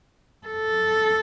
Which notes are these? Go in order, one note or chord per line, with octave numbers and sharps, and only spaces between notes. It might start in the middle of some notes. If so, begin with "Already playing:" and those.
A4